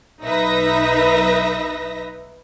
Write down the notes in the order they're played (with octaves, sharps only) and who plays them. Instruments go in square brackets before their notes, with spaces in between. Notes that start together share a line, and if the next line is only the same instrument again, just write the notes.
[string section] B1 D#4 B4 E5 A#6